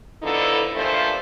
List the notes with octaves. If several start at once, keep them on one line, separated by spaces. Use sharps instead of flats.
D3 F3 B3 D#4 E4 A4
G2 A#2 F3 A3 A4 C5